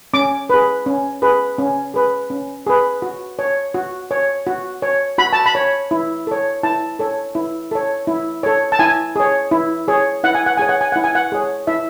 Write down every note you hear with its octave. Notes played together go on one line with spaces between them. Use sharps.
C#4 D6
G#4 B4
C#4
G#4 B4
C#4
G#4 B4
C#4
G#4 B4
F#4
C#5
F#4
C#5
F#4
C#5
F#4 B5
A5
B5
C#5
E4
A4 C#5
E4 A5
A4 C#5
E4
A4 C#5
E4
A4 C#5
A5
E4 G#5
G#4 C#5
E4
G#4 C#5
E4 F#5
G#5
F#5
G#4 C#5 G#5
F#5
G#5
E4 F#5
G#5
F#5
G#4 C#5
E4 E5